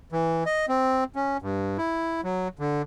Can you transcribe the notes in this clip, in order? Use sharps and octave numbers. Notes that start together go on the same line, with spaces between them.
E3
D#5
C4
C#4
G2
E4
F#3
D3